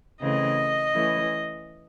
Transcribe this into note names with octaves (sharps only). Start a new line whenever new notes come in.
C#3 E3 A3 C4 D#5
E3 A3 C#4